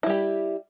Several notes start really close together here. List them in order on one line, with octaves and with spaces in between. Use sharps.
E4 G3 G4